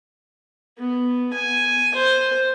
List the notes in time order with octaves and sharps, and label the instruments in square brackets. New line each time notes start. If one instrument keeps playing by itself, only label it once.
[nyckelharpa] B3
G#5
C5